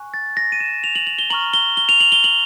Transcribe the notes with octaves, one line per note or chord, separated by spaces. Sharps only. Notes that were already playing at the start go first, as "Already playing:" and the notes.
Already playing: G#5 C#6 F#6
A6
A#6
D#7
E7
F7
F#7
F#7
G7
A#5 C#6 F6 F#7
G7
G7
F7
F#7
G7
F#7